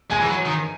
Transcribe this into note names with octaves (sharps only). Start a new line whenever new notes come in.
G#3 G#5
E3
F#3
D#3